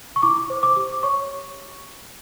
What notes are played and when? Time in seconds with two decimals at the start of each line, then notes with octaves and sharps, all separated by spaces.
0.16 C#6
0.22 E4 D6
0.50 C5
0.63 D6
0.76 G4
1.03 C#5 C#6